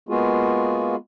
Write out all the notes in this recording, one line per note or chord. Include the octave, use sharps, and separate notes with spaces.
G#3 A#3 B3 F4 F#4 G#4